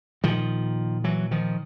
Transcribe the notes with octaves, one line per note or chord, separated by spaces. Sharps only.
A#2 D#3 F3
E3 F#3
D#3 F3